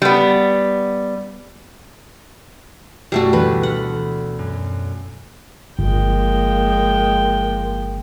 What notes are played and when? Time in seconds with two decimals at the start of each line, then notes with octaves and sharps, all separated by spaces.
0.02 G3 B3
3.12 F#2 B2 G3 A3 F#4 C7
3.33 D2 E3 B4
3.63 A4 F#5 B5 F6
4.39 F#2
5.79 G1 F3 G#3 A#3 G5